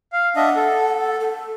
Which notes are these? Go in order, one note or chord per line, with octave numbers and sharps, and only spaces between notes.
F5
D4 D#5 E5 F#5
A4
A4